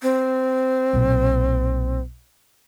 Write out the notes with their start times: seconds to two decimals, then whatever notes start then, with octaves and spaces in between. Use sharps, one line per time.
0.03 C4
0.93 B1 A#2